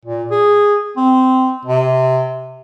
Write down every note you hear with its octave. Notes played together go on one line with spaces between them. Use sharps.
A#2
G#4
C4
C3